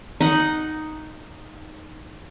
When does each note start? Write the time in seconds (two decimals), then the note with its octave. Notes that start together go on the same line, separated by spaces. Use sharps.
0.21 D#4 F#5